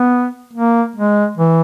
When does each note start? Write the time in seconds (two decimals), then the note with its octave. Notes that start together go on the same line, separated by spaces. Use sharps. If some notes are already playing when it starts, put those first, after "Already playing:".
Already playing: B3
0.53 A#3
0.96 G#3
1.38 E3